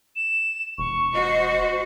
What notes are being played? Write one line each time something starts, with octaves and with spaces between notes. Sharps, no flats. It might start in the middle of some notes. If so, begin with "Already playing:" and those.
E7
E1 C#6
F#4 C5 D#5